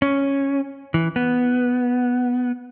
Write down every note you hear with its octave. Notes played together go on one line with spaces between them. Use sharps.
C#4
E3
B3